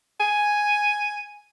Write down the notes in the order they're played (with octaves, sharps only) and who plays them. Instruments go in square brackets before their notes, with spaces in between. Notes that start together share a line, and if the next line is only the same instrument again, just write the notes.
[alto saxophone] G#5